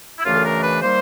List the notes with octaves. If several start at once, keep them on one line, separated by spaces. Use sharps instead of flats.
E4
F#2 C#3 E3 A3 D4 F4
A4
A#4
B4
D#3 G3 A#3 C5